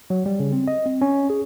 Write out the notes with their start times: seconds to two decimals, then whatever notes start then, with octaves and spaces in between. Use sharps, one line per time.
0.10 F#3
0.26 G3
0.40 C#3
0.53 C4
0.68 D#5
0.86 C4
1.01 C#4
1.30 G#4